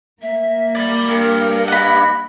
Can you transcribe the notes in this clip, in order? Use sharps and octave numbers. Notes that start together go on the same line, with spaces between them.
A#3 E5
D5 B5
G2 A#4
D#5 F#5 B5